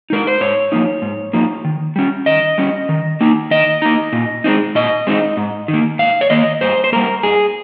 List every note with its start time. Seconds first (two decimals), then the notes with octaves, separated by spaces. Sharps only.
0.10 G#3 D#4 A#4
0.27 C5
0.41 G#2 C#5
0.72 F3 A#3 D#4
1.02 G#2
1.33 F3 A#3 D#4
1.65 D#3
1.96 G3 C#4
2.26 D#3 D#5
2.58 G3 C#4
2.89 D#3
3.21 A#3 D#4
3.51 D#3 D#5
3.82 A#3 D#4
4.13 A#2
4.44 G#3 C4 D#4
4.75 A#2 D#5
5.07 G#3 C4 D#4
5.37 G#2
5.68 D#3
5.73 A#3
5.99 G#2 F5
6.21 C#5
6.30 D#3 A#3 D#5
6.61 G2 C5
6.84 C5
6.92 G3 A#3 A#4
7.23 G2 G#4